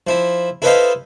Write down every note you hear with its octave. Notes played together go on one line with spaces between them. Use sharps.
F3 E4
E4 A4 B4 C5 D#5 F5